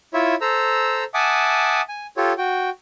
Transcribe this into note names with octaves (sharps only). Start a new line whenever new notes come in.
E4 F4 C#5 E5
A4 C5 A#5 E6
E5 F#5 G#5 A5 D6 D#6
G#5
F4 G4 A4 C#5
F#4 G5